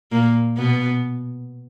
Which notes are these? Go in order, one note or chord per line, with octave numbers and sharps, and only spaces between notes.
A#2 A#3
B2 B3